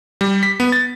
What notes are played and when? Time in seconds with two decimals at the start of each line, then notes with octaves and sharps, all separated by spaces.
0.21 G3
0.43 B6
0.60 B3
0.72 A6